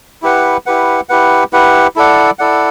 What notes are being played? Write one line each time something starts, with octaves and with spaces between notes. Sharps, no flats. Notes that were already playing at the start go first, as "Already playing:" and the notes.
E4 G4 B4 F#5
E4 G4 B4 F#5
E4 G4 B4 F#5
E4 G4 B4 F#5
E4 A4 D5 F#5
E4 A4 D5 F#5